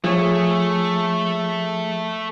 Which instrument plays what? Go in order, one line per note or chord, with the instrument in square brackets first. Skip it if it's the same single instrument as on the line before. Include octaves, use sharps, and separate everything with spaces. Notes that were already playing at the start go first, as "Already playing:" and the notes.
[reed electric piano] F3 [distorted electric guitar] A3 [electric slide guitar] G#4 C#5